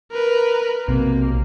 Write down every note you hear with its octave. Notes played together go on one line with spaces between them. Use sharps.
A#4 B4
B1 C3 A#3